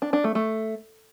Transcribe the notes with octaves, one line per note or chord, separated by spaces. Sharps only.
D4
D4
A3
A3